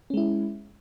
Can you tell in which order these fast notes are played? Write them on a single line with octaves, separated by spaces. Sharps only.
C#4 G#3 E4